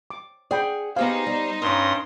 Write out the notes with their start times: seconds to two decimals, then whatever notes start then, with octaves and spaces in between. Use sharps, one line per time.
0.10 D6
0.51 G#4 D5 F#5 G5 B5
0.96 B3 D#4 G4 G#4 C5 F5
1.26 G3
1.62 G2 C#4 A#4 C6 D#6